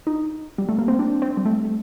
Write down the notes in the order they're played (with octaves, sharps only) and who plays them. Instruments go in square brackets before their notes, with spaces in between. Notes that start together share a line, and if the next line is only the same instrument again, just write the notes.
[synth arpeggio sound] D#4
G3
A3
A#3
C4
D4
C4
G3
A3